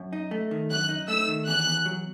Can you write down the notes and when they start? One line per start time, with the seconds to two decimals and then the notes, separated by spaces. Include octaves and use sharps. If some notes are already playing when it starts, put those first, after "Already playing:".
Already playing: F#2
0.13 D#4
0.31 A3
0.51 D#3
0.70 F#2 F#6
0.89 D#4
1.08 A3 E6
1.28 D#3
1.47 E2 F#6
1.66 E2
1.86 F#3